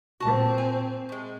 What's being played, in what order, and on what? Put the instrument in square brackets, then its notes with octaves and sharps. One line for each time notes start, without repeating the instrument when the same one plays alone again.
[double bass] A#2 C4 [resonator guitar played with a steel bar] F#4 A5
[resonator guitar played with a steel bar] G#5
A2 G#3